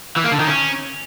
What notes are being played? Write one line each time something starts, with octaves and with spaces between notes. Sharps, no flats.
E3
A#3
D3
D#3
C#4